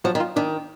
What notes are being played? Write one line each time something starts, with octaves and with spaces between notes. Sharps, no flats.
F3 F#3
D#3
F4
D#3 D4